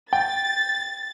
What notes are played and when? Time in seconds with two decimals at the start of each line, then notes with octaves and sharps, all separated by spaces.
0.13 G5 A6